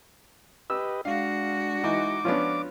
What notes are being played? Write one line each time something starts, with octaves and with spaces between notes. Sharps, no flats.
G4 B4 D#5 E6
G#3 D4 F#4 F5
E3 D#4 D6
F3 B3 C#4 D4 F4